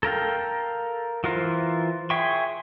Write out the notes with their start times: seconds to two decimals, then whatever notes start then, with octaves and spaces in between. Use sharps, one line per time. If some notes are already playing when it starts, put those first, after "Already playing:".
0.03 A4 A#4 F5 G5
1.24 E3 E4 F4 A#4 C5
2.10 G#4 E5 G5 C6 C#6